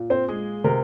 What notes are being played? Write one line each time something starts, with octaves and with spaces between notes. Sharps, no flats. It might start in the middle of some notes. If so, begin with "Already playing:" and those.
Already playing: A#2
C4 C5
G#3 G#4
C3 A#4